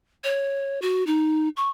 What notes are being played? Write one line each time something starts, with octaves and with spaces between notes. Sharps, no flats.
C#5
F#4
D#4
C#6